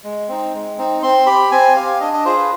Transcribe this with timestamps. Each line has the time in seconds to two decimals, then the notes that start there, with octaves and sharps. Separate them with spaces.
0.04 G#3
0.28 C4 D#4
0.54 G#3
0.78 C4 D#4
1.03 C4 C6
1.26 G4 B5
1.51 C4 G#5
1.76 G4 F5
2.00 D4 D#5
2.13 D#5
2.25 F4 G#4 C5
2.38 B4